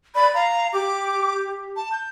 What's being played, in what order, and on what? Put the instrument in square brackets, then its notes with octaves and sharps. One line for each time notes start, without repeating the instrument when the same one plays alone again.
[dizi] D5 [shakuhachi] B5
[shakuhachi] F5 [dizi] A#5
[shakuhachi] G4 [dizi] D6
[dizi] A5
G6